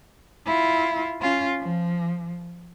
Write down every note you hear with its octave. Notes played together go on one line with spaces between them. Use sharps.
E4 F4
C#4 F4
F3